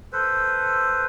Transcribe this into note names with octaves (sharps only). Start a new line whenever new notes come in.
A4 B4 C5